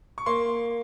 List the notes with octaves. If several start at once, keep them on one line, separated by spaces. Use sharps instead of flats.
C#6
A#3 C6